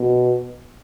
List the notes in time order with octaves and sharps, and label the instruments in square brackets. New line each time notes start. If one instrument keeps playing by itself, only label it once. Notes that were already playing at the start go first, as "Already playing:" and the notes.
Already playing: [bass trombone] B2